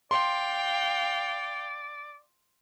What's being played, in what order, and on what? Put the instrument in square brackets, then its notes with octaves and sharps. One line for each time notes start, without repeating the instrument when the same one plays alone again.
[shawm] D5 [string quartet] F5 G5 [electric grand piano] C6